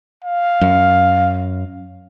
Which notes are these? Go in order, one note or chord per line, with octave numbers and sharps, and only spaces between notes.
F5
F#2